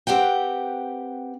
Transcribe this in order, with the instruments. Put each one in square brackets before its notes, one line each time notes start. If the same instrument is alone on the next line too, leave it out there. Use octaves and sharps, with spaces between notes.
[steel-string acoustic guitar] C4 G4 B4 F#5 G5